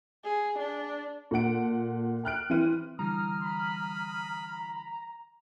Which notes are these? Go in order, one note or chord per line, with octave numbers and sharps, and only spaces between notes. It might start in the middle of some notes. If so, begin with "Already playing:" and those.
G#4
D4
A#2 A4 F#5 D7
G5 F6 F#6 D7
E3 C4 E4 D#7
D3 E3 G3 A#5 D#6 F6
B5